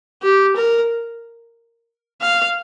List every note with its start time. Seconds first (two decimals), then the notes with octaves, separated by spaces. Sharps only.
0.23 G4
0.56 A#4
2.22 F5